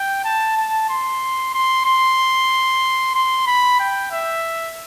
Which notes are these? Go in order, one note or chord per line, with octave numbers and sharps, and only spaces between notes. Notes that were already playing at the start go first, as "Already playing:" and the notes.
Already playing: G5
A5
A5
C6
C6
C6
C6
B5
G5
E5